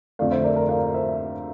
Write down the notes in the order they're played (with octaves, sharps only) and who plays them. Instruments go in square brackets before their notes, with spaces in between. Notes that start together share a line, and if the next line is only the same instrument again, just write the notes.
[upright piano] F2 D3 A3 D5 F5
C5 E5
A#4 D5
A#4 D5
D5 F5
C5 E5